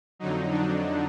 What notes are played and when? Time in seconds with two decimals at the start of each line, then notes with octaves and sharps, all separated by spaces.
0.19 F2 D3 F#3 D#4
0.50 D4